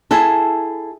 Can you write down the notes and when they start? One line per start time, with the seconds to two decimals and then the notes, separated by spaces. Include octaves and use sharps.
0.11 E4 G#4 A4